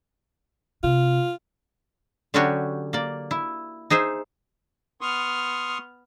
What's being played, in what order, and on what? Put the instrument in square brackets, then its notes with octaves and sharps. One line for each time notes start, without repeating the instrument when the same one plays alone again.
[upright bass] C3 [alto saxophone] F4
[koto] D3 F#3 C#4 D4 F#4 G4
A#3 D5
E4
D#4 G#4 C5 E5
[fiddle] B3 F6 [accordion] C6 C#6 D#6